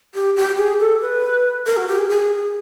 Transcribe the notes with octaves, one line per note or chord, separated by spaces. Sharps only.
G4
G4
G#4
A4
B4
A#4
F#4
G4
G#4
G#4